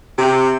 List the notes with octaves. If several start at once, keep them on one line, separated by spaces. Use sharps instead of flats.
C3